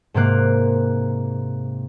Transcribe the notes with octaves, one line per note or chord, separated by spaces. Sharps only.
G#2 C3 A#3 F#6